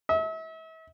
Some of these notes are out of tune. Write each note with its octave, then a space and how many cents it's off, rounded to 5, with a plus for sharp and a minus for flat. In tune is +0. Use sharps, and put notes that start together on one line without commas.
E5 -40